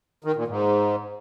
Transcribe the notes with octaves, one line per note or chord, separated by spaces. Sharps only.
D#3
A#2
G#2